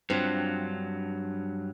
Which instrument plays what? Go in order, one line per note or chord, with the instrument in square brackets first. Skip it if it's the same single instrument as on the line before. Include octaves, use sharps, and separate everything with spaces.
[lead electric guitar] G2 F#3 [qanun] C4 D4 F4